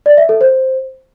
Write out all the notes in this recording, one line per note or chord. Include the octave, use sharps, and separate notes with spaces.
D5
E5
A4
C5